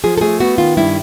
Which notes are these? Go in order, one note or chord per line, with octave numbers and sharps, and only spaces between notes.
F3 G#4
A4
A3 G#4
B3 F#4
D#3 F4
G2 E4